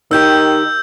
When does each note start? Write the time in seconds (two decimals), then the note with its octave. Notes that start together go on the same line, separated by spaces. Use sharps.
0.11 D#3 D#4 G4 E6 G6